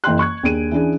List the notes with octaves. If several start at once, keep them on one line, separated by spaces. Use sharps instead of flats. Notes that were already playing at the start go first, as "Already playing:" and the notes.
F#1 E3 G5 C6 F#6
C#6 F#6 G#6
D#2 D4 G#4 D7 D#7
E3 C#4 D4 G#4